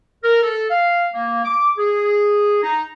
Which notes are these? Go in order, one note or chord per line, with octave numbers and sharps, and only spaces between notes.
A#4
A4
F5
A#3
D6
G#4
D#4